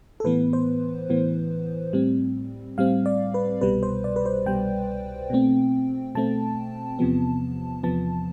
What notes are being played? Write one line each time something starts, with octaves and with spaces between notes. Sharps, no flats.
A4
A2 E3 B3 B4
C5
A2 E3 B3
A2 G3 C4
A2 G3 C4 F5
D5
B4
C2 B2 G3 B4
C5
D5
B4
C5
C2 B2 G3 G5
B2 A3 C4
B2 A3 C4 A5
E2 C3 F3 B3
E2 C3 F3 B3 A5